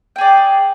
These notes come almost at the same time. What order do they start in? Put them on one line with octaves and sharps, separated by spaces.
G5 G#4 D5